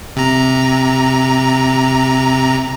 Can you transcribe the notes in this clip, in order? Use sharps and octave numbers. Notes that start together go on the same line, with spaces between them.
C3 A#5